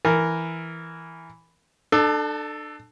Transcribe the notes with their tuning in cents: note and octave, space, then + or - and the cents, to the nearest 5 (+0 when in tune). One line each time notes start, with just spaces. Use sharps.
E3 +0 A#4 -5
D4 +35 A4 +0